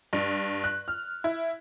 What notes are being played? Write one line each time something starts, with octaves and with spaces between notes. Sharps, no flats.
G2
F#6
F6
E4